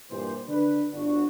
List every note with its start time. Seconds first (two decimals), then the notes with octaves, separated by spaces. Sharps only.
0.10 G2 A#2 E3 G3 G4 C5
0.48 D3 D4 B4
0.92 G1 D4 F#4